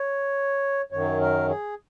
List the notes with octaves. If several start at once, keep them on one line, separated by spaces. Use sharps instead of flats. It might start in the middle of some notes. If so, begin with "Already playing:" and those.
Already playing: C#5
F#2 D#3 F#3 C#5
A#4
G#4